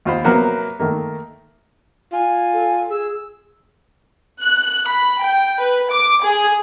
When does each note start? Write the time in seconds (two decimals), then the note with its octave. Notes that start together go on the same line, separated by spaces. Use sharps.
0.05 D#2 F4 C5 B5
0.24 C3 F#3 A#3 B3 C5 F#5
0.80 D#3 A3 A#3
2.12 F4 G#5
2.53 A4
2.90 G#4 E6
4.40 F#6
4.87 B5
5.21 G5
5.59 B4
5.91 D6
6.24 G#4